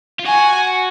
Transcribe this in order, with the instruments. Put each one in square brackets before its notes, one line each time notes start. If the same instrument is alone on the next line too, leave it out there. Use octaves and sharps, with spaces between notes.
[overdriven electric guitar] F4
[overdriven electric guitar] F#4 [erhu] G#5